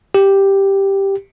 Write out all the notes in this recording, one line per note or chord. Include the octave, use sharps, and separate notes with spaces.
G4